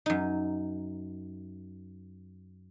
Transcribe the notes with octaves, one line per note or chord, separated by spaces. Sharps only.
F#2 D#4